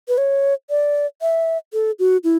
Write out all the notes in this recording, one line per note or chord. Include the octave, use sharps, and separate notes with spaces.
B4
C#5
D5
E5
A4
F#4
E4